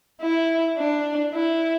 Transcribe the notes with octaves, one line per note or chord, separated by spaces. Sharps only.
E4
D4
E4